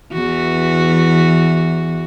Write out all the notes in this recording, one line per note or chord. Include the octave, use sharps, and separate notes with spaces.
E2 E3 F#4